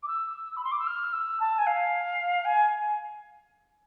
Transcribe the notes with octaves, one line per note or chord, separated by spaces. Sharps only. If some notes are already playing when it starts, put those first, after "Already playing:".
D6
E6
B5
C6
D6
E6
F6
E6
A5
G#5
F5
G#5